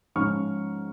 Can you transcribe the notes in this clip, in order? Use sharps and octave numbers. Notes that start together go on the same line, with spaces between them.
G#2 F3 C#4 C#6 F6